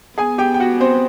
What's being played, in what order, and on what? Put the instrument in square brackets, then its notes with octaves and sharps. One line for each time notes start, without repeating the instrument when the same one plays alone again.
[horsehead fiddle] B3 [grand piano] G#4 G#5
[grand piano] G4 G5
G5
F#4 F#5
C4 C5